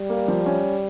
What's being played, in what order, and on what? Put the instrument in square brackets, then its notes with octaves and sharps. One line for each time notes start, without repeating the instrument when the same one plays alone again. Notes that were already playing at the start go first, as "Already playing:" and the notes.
Already playing: [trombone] G3
[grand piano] A#3
F3
C#4